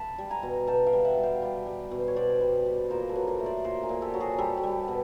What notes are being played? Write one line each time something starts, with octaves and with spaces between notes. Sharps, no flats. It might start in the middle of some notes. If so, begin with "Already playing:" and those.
Already playing: A5 B5
G3
G#5 A#5
B2
B2 G5 A5
F5 G5
G3
E5 F#5
G3
F5 G5
G3
G3
B2
C5
C#5
B2 C5 D5
G3
G3
A#2 A#4 C5
A4 B4
F#3
A#4 C5
A3
C5 D5
A#2 A#4 C5
G#4 A#4
A#2
G4 A4
F#3
F#4 G#4
G3 G4 A4
G4 A4
G3
B2